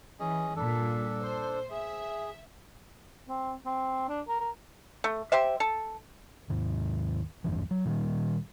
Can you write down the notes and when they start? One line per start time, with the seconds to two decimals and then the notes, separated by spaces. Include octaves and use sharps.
0.20 E3 C#4 G#4 D#5
0.56 G2 A#2 D4 A4
1.21 C5
1.71 G#4 E5
3.29 C4
3.66 C4
4.09 D4
4.28 A#4
4.40 A#4
5.04 A3
5.32 G4 C5 E5
5.60 A4
6.50 D#2 G#2 D#3
7.44 G#1 E2 G2 E3
7.71 F#3
7.85 A#2 D#3 E3 G3